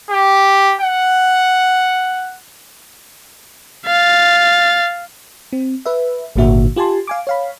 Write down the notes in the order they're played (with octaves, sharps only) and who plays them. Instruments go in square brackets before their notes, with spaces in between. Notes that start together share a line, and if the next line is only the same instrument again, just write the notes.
[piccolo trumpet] G4
F#5
[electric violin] F5 A6
[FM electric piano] C4
B4 E5
G#1 A#2 D3 A#3 F#4 E5
F4 G4 G#5 A5 C6
F5 G#5 D6
C#5 F5 B5